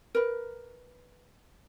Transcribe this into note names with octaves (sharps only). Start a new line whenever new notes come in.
A#4 B4